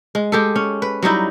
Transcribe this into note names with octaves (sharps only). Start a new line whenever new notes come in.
G#3
G#3 G4 A4
C#4
B4
F#3 G3 D#4 E4